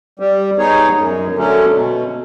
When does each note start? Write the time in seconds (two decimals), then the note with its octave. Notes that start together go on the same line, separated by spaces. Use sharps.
0.20 G3
0.58 B3 D#4 G#4 C#5
0.96 F#2
1.35 D3 F#3 A3 C#4
1.73 B2